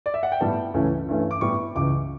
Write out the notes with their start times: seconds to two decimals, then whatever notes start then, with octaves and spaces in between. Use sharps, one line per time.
0.06 D5
0.14 E5
0.23 F#5
0.32 G5
0.41 A2 G3 B3 A5
0.74 C#2 C#3 E3 A3 C#4
1.08 G2 E3 A3 C#4
1.31 D6
1.41 A2 G3 B3 C#6
1.75 C#2 C#3 E3 D6